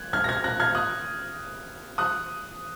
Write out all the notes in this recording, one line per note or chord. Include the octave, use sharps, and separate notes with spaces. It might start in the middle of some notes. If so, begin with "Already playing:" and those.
Already playing: F#6 G#6
F6 G#6
A#6
F6 G#6
F#6 A#6
F6 G#6
D#6 F#6
D#6 F#6